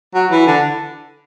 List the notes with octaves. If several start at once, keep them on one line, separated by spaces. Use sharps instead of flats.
F#3
E3
D3